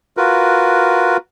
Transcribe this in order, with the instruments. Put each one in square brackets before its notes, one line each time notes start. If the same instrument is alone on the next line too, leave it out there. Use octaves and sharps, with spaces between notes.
[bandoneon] F4 F#4 A#4 B4